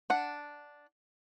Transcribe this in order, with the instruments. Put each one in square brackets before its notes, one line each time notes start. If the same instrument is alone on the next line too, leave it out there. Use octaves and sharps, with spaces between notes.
[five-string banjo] D4 F#5